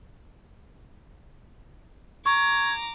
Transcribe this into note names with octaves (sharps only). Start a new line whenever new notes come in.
A#5 C#6 D6 G#6